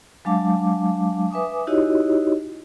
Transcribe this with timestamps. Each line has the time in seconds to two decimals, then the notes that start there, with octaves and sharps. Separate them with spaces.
0.25 F#3 G#3 D4 F5 A5 D6
1.31 B4 E5 G#5 D6 D#6
1.67 D#4 E4 F#4 G4 C#5 D#5